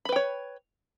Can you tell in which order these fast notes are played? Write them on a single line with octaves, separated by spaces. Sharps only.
B5 B4 G5 C#5